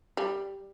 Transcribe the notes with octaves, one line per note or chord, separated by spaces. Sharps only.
G3